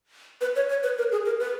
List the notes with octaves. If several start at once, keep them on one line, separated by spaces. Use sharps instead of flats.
B4
C#5
C#5
B4
A#4
G#4
A#4
B4